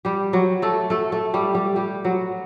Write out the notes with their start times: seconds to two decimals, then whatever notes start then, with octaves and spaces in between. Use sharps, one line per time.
0.05 G3 G4
0.33 F#3 F#4
0.62 A3 A4
0.90 A3 A4
1.12 A3 A4
1.34 G3 G4
1.55 G3 G4
1.76 G3 G4
2.05 F#3 F#4